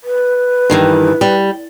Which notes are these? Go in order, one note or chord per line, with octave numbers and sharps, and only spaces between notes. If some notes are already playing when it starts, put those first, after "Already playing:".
B4
G2 D#3 E3
G3